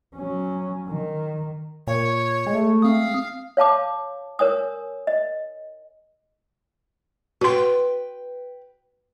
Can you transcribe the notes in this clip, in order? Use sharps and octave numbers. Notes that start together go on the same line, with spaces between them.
F#3 C#4
D#3
A#2 C#5
G#3 A3
C4 F5 D#6
C#5 F5 A5 D6
A#4 C#5 G#5 D#6
D#5
F#4 B4 G5 C6